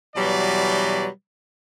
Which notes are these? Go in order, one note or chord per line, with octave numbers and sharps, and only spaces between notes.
B2 E3 F#3 G3 B4 D5